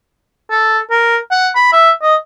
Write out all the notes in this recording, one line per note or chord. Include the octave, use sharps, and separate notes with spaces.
A4
A#4
F#5
B5
E5
D#5